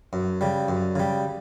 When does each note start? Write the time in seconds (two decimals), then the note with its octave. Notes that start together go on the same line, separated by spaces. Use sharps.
0.13 F#2
0.41 C#3 G3
0.69 F#2
0.95 C#3 G3